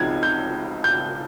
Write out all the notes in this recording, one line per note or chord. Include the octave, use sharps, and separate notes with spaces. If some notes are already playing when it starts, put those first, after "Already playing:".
Already playing: C#2 C#3 F3 C4 D#4 G#6
G6
G6